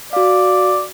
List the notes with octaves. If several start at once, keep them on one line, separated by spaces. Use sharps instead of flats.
F#4 D5 F5